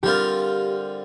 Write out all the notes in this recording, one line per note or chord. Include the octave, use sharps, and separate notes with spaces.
D3 G3 C4 F4 G4 A#4